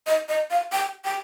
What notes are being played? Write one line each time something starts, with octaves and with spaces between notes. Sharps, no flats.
D#5
D#5
F5
G5
G5